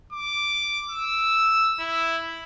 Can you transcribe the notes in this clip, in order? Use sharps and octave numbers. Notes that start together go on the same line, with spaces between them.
D6
E6
E4